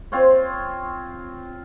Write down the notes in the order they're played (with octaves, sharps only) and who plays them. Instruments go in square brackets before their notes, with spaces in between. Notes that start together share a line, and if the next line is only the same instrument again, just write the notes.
[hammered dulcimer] C4 F4 C5 C#5